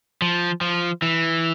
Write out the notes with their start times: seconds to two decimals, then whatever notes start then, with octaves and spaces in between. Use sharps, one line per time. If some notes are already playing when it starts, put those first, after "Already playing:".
0.22 F3
0.61 F3
1.02 E3